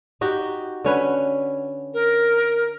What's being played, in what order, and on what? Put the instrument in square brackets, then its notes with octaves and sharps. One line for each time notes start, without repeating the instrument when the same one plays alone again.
[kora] D#4 F#4 G4
D3 C#4 B4
[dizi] A#4